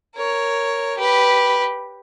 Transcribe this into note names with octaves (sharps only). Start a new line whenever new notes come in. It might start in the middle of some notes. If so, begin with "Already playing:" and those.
A#4 C#5
G4 B4